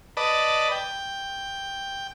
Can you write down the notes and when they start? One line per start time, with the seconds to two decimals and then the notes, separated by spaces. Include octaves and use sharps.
0.17 B4 D5 D#5 A5
0.72 G5